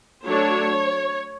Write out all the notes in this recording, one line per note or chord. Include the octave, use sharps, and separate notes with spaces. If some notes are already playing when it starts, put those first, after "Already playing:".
F#3 A3 D4 C#5